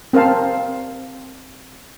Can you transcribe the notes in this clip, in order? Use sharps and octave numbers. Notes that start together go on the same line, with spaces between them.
C4 A#4 C5 F5 A5